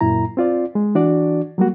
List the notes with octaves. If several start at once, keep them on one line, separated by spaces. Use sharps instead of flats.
F#2 A#2 E4 A#5
C4 F4 D5
G#3
E3 D4 F#4 D5
F#3 G3 A#3 F#4